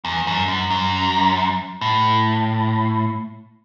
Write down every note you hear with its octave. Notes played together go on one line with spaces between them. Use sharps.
E2
F#2
F#2
F#2
A2